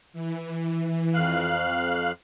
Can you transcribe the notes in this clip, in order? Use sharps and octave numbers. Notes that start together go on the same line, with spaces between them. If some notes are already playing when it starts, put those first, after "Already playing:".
E3
F2 F5 F#6